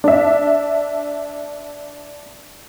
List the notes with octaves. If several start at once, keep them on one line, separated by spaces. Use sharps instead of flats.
D4 E5